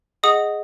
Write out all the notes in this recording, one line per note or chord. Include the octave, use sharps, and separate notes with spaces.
G#4 D#5 F#5 D#6